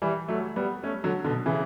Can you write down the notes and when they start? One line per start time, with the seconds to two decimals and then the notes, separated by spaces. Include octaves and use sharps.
0.02 E3 G3
0.28 F#3 A3
0.56 G3 B3
0.84 A3 C#4
1.04 D3 F#3
1.25 B2 D3
1.46 C#3 E3